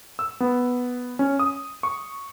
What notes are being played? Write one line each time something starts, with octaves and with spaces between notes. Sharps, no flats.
E6
B3
C#4
D#6
C#6